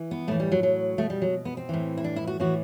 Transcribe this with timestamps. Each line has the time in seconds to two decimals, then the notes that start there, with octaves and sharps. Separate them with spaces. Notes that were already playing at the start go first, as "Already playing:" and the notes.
Already playing: E3
0.11 B3
0.28 A2 E3 A3
0.40 G3
0.52 F#3
0.63 F#3
0.98 B2 A3
1.10 G3
1.22 F#3
1.45 B3
1.57 C4
1.69 A2 E3
1.98 E4
2.04 D4
2.16 E4
2.27 F#4
2.40 A2 E3 F#4